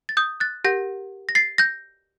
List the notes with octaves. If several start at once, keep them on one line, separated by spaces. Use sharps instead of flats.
A6
D#6 G6
F#6 A6
G4 A#4 F#5 G6 A#6
A#6
A6 C7
G6 A#6